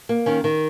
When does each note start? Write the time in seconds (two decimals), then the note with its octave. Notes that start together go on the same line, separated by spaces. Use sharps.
0.09 A#3
0.26 D#3 C#4
0.44 D#3